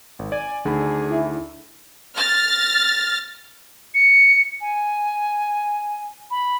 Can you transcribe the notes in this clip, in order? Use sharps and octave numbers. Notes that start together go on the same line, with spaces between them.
G#1
D5 G#5
D2 D4 D#4 G#4 A4 B5
E4
F6 A6 A#6
C#7
G#5
B5